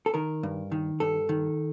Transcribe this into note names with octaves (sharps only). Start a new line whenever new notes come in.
A4
D#3 A#4
G2
D#3
G2 A4
D#3